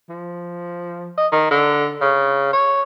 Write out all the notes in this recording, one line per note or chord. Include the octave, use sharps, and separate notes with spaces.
F3
D#5
D#3
D3
C#3
C#5